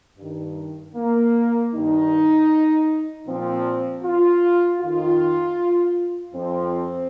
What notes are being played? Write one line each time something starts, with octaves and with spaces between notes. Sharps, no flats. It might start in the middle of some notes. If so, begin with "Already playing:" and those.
G2 D#3
A#3
G2 D#3 D#4
A#2 F3 C4
F4
F2 D#3 F4
F2 F3 C4